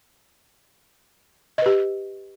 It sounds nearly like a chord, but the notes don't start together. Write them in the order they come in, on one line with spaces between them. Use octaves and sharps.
D#5 B4 G4